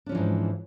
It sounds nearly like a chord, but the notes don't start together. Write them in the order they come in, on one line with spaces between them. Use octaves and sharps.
D4 C#4 F3 E3 G#2